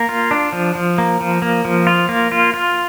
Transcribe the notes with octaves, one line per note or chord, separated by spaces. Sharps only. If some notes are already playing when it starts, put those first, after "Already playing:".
Already playing: A#3
F4
D4
F3
F3
A#3
F3
A#3
F3
F4
A#3
F4
F4